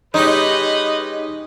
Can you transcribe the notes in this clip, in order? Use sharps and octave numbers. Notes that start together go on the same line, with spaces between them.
G#3 C#4 D#4 G4 B4 D#5